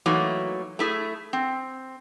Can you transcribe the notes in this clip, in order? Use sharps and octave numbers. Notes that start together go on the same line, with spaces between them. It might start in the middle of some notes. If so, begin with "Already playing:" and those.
E3 F#3 A3 A#3 D#4
A3 E4 G#4
C4